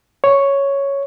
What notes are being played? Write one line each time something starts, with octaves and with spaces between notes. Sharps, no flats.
C#5